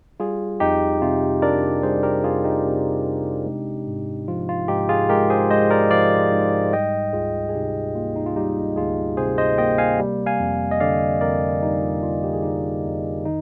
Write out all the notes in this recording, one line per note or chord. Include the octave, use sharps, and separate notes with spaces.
G3 F4 G#4
F2 D#4 G4
C3 F4
D4 A#4 D5
G3 G#4 C5
G4 A#4
F2 F4 G#4
D#4 G4
C3
D4
G#3
G#2
F3 F4
F4
G#2 D#4 G4
F4 G#4
G#3 G4 A#4
G#4 C5
G#2 C5 D#5
A#4 D5
F3 D5 F5
G#2
G3 D#5 G5
D2 F4 G#4
G#4
C3 D#4 G4
A#3 F4
D#4
F4
G3 D#4 G4
D2 F4 G#4
C3 G#4 C5
C5 D#5
A#3 D#5 G5
F5 G#5
G3
F5 G#5
F2
D#5
D3 D5 F5
F2 A#4 D5
G3 D#4
F4
F2 F4
G4
G#4
D3 D#4 G4
F2
D#3 D#4